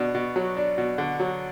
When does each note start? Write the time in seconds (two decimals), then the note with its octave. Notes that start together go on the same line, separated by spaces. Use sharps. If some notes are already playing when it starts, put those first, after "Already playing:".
Already playing: B2 D4
0.15 B2
0.36 F#3
0.57 D4
0.78 B2
0.98 D3
1.20 F#3